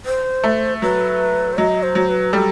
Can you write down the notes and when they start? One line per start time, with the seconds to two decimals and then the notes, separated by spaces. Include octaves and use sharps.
0.05 C5
0.44 A3
0.82 F#3 B4
1.53 C5
1.58 F#3 D#5
1.83 C5
1.95 F#3
2.09 B4
2.33 G3 A4